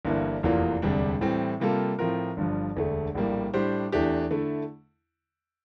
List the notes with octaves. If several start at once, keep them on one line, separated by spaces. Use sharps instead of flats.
G1 G2 E3 A#3 E4
F1 E2 E3 A#3 F4
E1 D2 C3 G3 D4
A2 E3 G3 C4
C3 G3 A#3 F4 A4
A2 F3 C4 F4 A#4
G1 G2 F3
E1 D2 D3 A3
A#1 A2 G3 A#3
A2 G3 D4 G4 C5
E2 E3 A3 D4 G4
D3 A3 E4